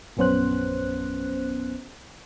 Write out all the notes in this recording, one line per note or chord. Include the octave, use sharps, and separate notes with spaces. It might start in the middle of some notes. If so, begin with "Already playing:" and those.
A#1 F#2 B3 C#4 C5 F#6